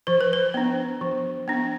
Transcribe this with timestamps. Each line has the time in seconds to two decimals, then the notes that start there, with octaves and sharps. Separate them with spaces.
0.07 F3 C5
0.21 B4
0.33 C5
0.54 B3 D4
1.01 F3
1.48 B3 D4